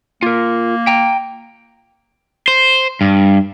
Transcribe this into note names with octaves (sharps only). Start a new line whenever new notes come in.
A#3 F4 A#4
G5 A#5
C5
G2